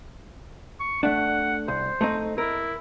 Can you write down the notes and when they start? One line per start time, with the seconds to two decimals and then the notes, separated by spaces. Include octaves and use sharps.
0.80 C#6
1.03 A3 D4 F#5
1.68 C2 C5
2.01 A3 C4 D#4
2.38 E4 A#4